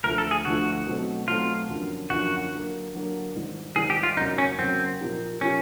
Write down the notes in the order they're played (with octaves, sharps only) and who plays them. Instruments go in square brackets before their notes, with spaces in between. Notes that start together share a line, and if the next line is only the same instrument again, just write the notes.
[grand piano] D2 D3 F3 A3 [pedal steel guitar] A#4
[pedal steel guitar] A4
G#4
[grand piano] D2 D3 F3 A3 [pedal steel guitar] F#4
[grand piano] B2 F#3 A3 C4 D#4
[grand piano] B2 F#3 A3 C4 D#4 [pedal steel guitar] F4
[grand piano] F#2 D3 F3 A#3
[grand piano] F#2 D3 F3 A#3 [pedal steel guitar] F#4
[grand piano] D3 F#3 A#3
D3 F#3 A#3
G#2 D#3 G3
[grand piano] G#2 D#3 G3 [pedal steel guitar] G#4
[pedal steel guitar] G4
F4
[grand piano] F#2 C#3 F#3 A#3 [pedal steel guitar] D#4
[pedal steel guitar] C#4
[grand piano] F#2 C#3 F#3 A#3 [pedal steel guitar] C4
[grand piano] A#2 F3 A#3 D#4 G4
[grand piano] A#2 F3 A#3 D#4 G4 [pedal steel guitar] C#4